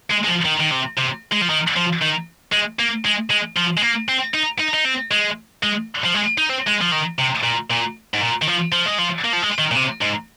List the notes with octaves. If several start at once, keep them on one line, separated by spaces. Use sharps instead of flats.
G#3
G#3
F3
D#3
D#3
C3
C3
G#3
F3
D#3
F3
D#3
G#3
A#3
G#3
G#3
F3
G#3
A#3
C4
D#4
D#4
D#4
C4
G#3
G#3
F3
G#3
D#4
C4
G#3
F3
D#3
C3
A#2
A#2
G#2
A#2
D#3
F3
F3
G#3
F3
A#3
F3
G#3
D#3
A#2
C3
G#2